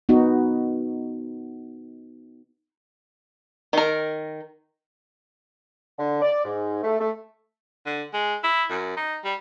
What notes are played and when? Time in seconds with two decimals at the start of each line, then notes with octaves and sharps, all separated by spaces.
0.09 B3 D#4 F#4
3.73 D#3 A#4
5.98 D3
6.21 D5
6.44 G#2
6.82 A3
7.00 A3
7.86 D3
8.13 G#3
8.44 E4
8.70 F#2
8.97 D#4
9.25 G3